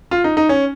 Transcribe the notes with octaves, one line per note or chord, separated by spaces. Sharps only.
F4
D#4
D#4
C#4